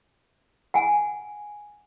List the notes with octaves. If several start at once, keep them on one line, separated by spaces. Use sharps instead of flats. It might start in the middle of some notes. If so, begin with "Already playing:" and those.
F#5 G#5